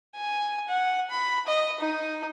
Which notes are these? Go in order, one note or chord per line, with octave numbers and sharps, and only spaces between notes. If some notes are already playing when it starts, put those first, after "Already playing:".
G#5
F#5
B5
D#5
D#4